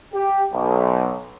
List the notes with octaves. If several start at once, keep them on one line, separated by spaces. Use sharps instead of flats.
G4
B1